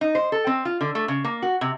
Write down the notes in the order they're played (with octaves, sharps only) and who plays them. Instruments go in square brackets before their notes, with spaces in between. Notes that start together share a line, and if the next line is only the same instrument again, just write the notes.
[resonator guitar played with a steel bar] D#4
C5
A4
C4
F4
D3
A3
C#3
A#3
F#4
C3